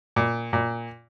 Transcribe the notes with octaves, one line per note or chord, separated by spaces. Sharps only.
A#2
A#2